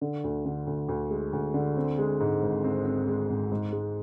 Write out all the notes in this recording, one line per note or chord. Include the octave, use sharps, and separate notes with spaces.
D3
D2
D3
D2
D2
G#3
D2
D3
C4
G#3
G#2
G#1
C4
C4
G#3
G#1
G#2
G#3